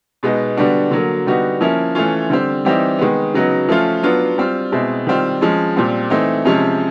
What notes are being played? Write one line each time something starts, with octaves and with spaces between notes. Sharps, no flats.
B2 G#3 B3 D#4
D3 G3 B3 D4 F#4
D3 F#3 A#3
D3 G3 B3 D#4 F#4
F3 A#3 C#4 E4
E3 A3 C#4 F4
D3 G3 C4
E3 G3 C4 D#4
D#3 G#3 B3
C#3 F#3 B3 D#4
F3 A3 C#4 F4
F#3 B3 D4 F4
G3 C4 F4
B2 G#3 C4 E4
D#3 G3 C4 F4
F3 G#3 C#4
A#2 G3 C4
E3 A3 C4 D#4
C3 F3 G#3 C#4